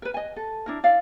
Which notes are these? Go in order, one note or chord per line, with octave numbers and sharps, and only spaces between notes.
A#4 B4
D#5 G#5
A4
D4 E4 A#4
E4 D5 F5